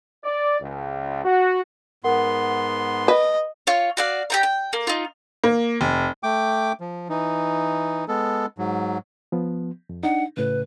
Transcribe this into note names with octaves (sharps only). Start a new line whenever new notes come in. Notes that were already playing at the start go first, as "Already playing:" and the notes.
D5
C#2
F#4
G#2 B3 A#4 F#5 C6
B4 D#5
F4 C#5
F#4 D5 F5
G4 G5 A#5
G5
A#3
D#4 F4
A#3
F1
A3 G5 D6
F3
E3 D#4
G#3 B3 A4
G#2 F#3
F3 B3
F2
D4 D#4 F#5
A2 C#3 B4